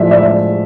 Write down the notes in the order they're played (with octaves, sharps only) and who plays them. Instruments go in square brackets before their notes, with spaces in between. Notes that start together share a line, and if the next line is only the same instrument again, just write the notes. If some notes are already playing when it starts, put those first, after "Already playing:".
Already playing: [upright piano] A2 F3 G#3 D5 E5
D5 E5